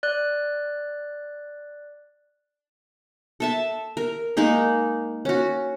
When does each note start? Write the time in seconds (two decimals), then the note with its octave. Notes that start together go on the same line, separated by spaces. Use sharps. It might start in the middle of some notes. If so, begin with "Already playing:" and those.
0.03 D5 F#6
3.40 A4 E5 A5
3.97 A#4
4.37 G#3 A#3 D#4 G#4
5.25 C#4 F#4